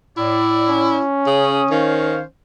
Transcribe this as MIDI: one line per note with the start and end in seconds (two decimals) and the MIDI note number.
0.17 0.96 45
0.17 1.02 64
0.17 0.96 74
0.69 2.27 61
1.26 1.61 49
1.26 1.69 87
1.71 2.21 51
1.71 2.21 72
1.71 2.21 73
1.71 2.21 77